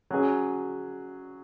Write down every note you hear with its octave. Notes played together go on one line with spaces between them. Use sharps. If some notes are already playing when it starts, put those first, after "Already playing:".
F#3 C#4 G#4